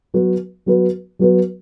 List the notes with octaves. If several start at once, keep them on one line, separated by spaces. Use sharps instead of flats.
F#3 B3 F#4 B4
F#3 B3 F#4 B4
F#3 B3 F#4 B4